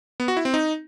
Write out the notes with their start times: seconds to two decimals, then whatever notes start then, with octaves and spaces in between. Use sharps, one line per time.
0.20 B3
0.28 F#4
0.37 E4
0.45 C4
0.54 D#4